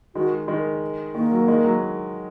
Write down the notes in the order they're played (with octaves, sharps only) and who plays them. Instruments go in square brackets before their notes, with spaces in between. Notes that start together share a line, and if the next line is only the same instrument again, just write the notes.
[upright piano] D#3 G#3 [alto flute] F#4
[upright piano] D#3 G#3
[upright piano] D#3 [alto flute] A#3
[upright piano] F#3
D#3 G#3
F#3